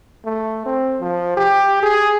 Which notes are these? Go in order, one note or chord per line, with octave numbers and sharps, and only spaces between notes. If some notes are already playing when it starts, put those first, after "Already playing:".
A3
C4
F3
G4
G#4